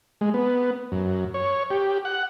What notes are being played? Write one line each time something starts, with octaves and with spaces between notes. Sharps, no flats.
G#3
B3
F#2
C#5
G4
F#5